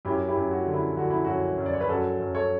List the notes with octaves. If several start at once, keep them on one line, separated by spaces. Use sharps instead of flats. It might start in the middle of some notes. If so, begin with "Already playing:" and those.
F#2 E4 G4
E4 G4
F#2
F#4
D3
E4
D3 F#4
E4
F#2 F#4
F#2
D5
C#5
B4
F#2 F#4 A4
F#2
A4 C#5